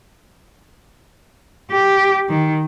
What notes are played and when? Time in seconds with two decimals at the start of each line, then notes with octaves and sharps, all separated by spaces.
1.71 G4
2.29 D#3